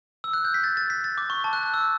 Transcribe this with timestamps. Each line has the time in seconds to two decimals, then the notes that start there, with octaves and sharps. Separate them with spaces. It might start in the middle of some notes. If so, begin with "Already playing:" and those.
0.24 E6
0.33 F#6
0.45 G6
0.54 B6
0.64 A6
0.77 A6
0.90 B6
1.04 A6
1.18 D6
1.30 C#6
1.44 A5
1.53 F#6
1.63 F#6
1.74 E6